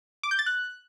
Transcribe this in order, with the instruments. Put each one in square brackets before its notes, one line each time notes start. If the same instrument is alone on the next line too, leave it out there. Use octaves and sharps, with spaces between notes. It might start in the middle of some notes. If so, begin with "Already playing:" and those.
[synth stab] D6
G6
A6
F#6